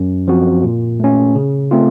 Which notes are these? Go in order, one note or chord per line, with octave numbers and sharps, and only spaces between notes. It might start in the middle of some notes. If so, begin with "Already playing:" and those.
Already playing: F#2
F3 C4 F#4
A#2
A3 C#4
C#3
A3 C4 F4